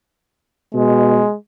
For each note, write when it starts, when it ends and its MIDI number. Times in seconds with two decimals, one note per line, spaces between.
0.74 1.22 47
0.74 1.36 56